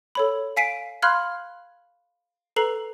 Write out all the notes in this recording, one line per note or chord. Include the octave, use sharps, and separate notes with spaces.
A4 C#5 B5
F5 G#5 B6 C7 D7 D#7
F5 B5 C6 F6 F#6 G#6
A4 B4 A#5 C7 F#7